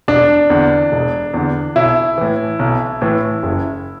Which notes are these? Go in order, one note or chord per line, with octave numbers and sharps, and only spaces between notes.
E1 D4
E2 D3
E1
E2 D3
B1 E4
A2 E3
B1
A2 E3
F#1